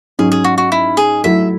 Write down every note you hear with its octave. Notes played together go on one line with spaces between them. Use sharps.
G#2 F#3 C#4 G#4
G#4
F#4
F#4
E4
G#4
F#3 A3 E4 A4 E5